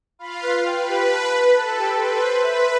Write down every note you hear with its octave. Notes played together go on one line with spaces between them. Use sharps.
F4 F5 B5
B4
B4 G5
G4
A5
B4
A4 A5
G4
B4 C6
C5
B4 E5